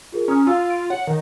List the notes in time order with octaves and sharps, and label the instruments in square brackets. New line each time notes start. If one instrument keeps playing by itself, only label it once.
[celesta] F4 G#4 A#4
[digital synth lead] C#4 [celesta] A#5 D#6 F6
[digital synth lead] F4 [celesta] F5 E6
[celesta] D7
[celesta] C#5 [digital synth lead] F#5
[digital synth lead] D#3